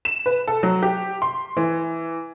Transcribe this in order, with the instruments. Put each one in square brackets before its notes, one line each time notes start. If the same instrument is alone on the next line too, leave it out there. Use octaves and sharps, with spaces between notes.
[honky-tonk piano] E7
B4
A4
F#3
G4
C6
E3